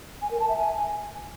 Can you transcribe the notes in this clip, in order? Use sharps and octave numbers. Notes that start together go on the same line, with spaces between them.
G#5
A#4
A5
E5
G#5